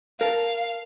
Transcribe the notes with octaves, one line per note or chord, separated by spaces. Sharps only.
A#4 F5 A5